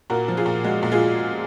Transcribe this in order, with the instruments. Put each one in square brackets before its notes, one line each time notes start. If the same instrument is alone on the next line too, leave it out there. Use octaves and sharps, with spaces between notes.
[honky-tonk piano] A#2 F#4 A#4
F3
F4 G#4
A#2
G#3 F#4
A#2
F4 G#4